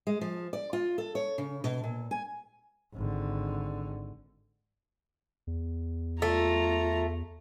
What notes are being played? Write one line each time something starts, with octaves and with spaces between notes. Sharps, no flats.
G#3
F3
D5
F4
A4
C#5
C#3
B2
A#2
G#5
G#1 D3
E2
A3 F4 A#5